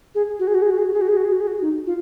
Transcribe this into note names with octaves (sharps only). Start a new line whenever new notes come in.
G#4
F#4
G#4
F#4
G#4
F#4
G#4
F#4
G#4
F#4
G#4
F#4
G#4
F#4
G#4
F#4
D#4
F4